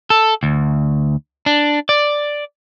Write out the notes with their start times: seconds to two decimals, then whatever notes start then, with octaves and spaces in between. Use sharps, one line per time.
0.10 A4
0.43 D2
1.46 D4
1.89 D5